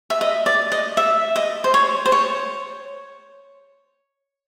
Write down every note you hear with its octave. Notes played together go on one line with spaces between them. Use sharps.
E5
D#5
D5
D#5
E5
D#5
C5
C#5
C5
C#5